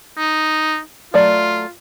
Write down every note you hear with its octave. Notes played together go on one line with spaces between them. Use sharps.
D#4
F#3 A3 F4 D5